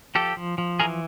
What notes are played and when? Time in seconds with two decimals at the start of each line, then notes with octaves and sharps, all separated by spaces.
0.15 F3 G4 A4
0.37 F3
0.58 F3
0.80 E3 G#4 A#4